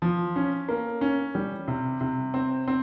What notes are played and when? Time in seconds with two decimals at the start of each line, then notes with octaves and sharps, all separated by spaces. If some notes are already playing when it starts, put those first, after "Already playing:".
0.02 F3
0.36 C#4
0.69 A#3
1.01 C#4
1.35 G3
1.68 C3
2.01 C3
2.34 C4
2.68 C4